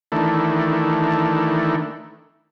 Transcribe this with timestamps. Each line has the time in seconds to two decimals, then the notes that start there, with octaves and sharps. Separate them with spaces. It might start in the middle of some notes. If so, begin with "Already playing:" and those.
0.12 D#3 E3 A3 D4